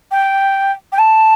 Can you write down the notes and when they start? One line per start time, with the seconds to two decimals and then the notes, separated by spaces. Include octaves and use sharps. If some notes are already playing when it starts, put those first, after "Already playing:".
0.12 G5
0.92 G5
0.98 A5